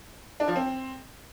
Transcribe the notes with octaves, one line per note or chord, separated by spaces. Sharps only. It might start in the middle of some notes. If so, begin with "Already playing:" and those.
D4
F3
C4